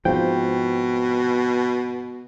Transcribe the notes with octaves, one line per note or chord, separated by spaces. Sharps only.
G#2 B2 F3 C4 G5